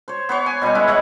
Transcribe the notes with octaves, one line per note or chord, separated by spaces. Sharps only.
C5 C#5
B3 C5 C#5
G#5
B2 G3 G#5 C#6
G#3 C#4 E4
E3 C#5 D#5 F#5